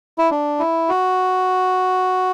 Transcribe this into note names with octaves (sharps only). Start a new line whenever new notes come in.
E4
D4
E4
F#4